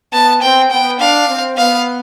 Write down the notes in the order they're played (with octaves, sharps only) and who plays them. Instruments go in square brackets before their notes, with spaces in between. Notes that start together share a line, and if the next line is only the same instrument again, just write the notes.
[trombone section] B3 [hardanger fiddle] A5
[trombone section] C4 [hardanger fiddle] G5
[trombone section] B3 [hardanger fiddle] G5
[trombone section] D4 [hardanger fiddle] F5
[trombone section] C4
[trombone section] B3 [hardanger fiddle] F5